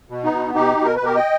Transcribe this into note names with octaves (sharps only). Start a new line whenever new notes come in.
B2
B3 D#4
B2
B2 D#4 G4
B2
A#4
B4
B2 G4 A#4
D#5 G5